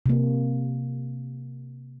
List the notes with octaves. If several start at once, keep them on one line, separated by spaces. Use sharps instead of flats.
C3 A#3